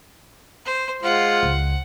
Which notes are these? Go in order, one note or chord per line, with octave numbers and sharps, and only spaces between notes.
C5
G#3 F4 C5 F#5
C#2